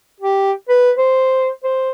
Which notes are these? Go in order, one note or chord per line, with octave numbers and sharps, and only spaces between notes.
G4
B4
C5
C5